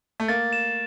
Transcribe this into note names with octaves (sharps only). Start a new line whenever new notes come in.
A3
A#3 A6
E7